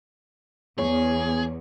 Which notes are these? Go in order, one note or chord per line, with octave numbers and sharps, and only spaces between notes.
E2 B3 G#4 C#5